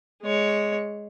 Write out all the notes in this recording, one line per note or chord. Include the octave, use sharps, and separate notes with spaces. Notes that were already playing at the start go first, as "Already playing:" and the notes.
G#3 C#5